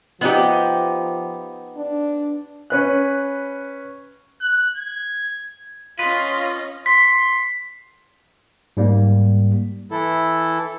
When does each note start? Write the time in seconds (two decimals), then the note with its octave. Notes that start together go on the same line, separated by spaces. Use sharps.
0.21 F3 B3 D#4 G4
1.77 D4
2.70 C#4 B4 F#6
4.41 F#6
4.76 G#6
5.99 C#4 F4 B4 D#5
6.86 C6 B6
8.77 G#2 G3 A#3
9.91 E3 E4 A4